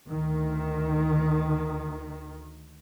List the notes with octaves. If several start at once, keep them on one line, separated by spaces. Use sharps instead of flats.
D2 D#3